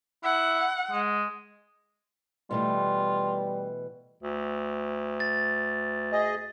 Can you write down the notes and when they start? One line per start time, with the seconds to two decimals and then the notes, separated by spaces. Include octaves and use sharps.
0.24 E4 F#5
0.91 G#3
2.51 B2 E3 G3 A3 F4
4.23 D2
5.20 A6
6.12 G#4 D#5